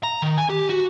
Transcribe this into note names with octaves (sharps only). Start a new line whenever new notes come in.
A#5
D#3
G#5
G4
F#4